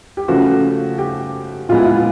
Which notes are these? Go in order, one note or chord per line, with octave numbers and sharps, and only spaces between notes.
G4
C#3 F3 A3 F#4
G4
A#2 F3 G#3 B3 F4
E4
F4